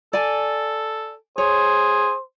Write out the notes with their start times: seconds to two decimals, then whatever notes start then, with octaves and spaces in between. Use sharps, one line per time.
0.13 A4 D5 G#5
1.38 G#4 C5 C#5